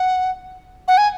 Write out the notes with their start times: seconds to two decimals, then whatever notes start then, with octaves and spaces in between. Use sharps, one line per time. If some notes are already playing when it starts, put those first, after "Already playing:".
Already playing: F#5
0.88 F#5
0.98 G#5